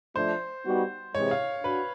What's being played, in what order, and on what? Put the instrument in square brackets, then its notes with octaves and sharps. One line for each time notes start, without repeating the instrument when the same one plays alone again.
[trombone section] F3 A3 D4 [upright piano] C5
[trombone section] G3 B3 D#4 F#4
[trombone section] C3 E3 G#3 [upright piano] C#5
[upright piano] F5
[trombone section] D4 F#4 [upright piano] B4